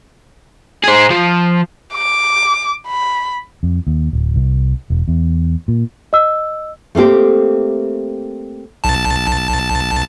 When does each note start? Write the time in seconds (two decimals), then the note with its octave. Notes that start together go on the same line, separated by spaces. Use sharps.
0.84 G#4 C5
1.10 F3
1.94 D6
2.87 B5
3.63 F2
3.87 D#2
4.13 D1
4.36 C2
4.90 E1
5.08 E2
5.68 A#2
6.13 D#5 E6
6.95 A3 A#3 C4 G4
8.84 B1 A5